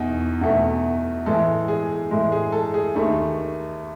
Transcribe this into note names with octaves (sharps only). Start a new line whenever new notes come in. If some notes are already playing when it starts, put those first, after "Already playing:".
Already playing: E2 B2 D#4
E2 B2 A3
A2 E3 G#3 A4
G#4
A2 E3 G#3
G#4
A4
G#4
D#2 D#3 A3